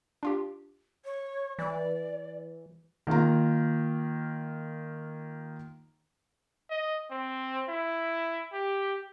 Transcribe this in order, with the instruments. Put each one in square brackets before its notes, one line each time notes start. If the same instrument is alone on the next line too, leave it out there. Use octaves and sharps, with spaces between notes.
[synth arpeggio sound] D4 F4 G4
[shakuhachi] C#5
[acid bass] E3 [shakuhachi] D5
[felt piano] D#3 A#3 F4 A#5
[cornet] D#5
C4
E4
G4